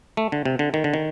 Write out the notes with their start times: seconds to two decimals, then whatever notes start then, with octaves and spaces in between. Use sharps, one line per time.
0.17 A3
0.32 D3
0.45 C3
0.59 D3
0.74 D#3
0.84 D3
0.94 D#3